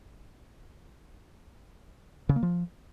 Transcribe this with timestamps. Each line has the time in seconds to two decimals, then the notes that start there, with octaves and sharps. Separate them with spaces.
2.29 C#3
2.36 A#3
2.43 F3